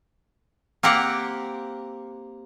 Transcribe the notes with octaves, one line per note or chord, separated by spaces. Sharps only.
A#3 C4 G4 A#4 F#5